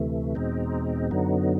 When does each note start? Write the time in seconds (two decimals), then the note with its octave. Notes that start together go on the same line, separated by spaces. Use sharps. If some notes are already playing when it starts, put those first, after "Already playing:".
Already playing: D2 C3 E3 A3
0.35 E2 B2 G#3 C4 D#4
1.11 F#2 D3 F#3 B3 D#4